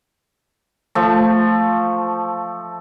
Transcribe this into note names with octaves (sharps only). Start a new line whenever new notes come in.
F3 A3